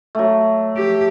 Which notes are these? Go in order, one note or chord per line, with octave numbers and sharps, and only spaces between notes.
F#3 A3
G4